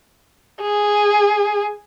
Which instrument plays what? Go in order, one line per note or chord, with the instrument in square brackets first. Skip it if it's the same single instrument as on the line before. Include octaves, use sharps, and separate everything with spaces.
[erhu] G#4